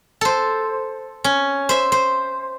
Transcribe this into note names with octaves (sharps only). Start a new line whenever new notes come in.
A4 C5
C#4
C5 E5
C5